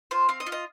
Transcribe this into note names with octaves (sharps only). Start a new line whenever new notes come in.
F4 C5
C4 F5
D#5
F4
D#5